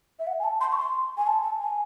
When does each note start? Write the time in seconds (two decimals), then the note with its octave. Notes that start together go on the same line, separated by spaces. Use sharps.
0.19 E5
0.27 F#5
0.39 G#5
0.44 A5
0.61 C6
0.72 C#6
0.77 C6
1.17 G#5
1.27 A5
1.43 A5
1.60 G#5